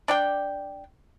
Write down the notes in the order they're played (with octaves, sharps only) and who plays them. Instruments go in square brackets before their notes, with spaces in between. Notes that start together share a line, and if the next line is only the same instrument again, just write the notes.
[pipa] D4 D5 G5